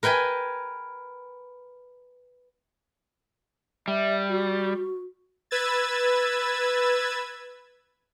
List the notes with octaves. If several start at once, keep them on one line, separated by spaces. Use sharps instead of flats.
A#4 B4 G5 G#5 B5
G3 E5
F#4
B4 E6 G#6 A6